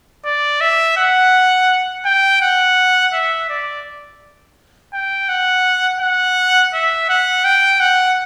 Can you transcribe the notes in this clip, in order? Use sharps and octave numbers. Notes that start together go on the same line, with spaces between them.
D5
E5
F#5
G5
F#5
E5
D5
G5
F#5
F#5
E5
F#5
G5
F#5